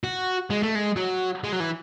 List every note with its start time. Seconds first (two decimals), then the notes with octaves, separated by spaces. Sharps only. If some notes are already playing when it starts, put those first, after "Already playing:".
0.04 F#4
0.50 G#3
0.63 A3
0.75 G#3
0.96 F#3
1.44 G#3
1.52 F#3
1.60 E3